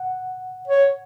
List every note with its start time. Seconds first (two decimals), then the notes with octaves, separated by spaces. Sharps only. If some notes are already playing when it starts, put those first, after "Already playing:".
Already playing: F#5
0.68 C#5